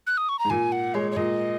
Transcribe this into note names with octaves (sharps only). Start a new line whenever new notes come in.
F#6
D#6
C#6
A#5
G#2
A#2 G#5
F#5
G#3 C#5
C#5
A#2 D#5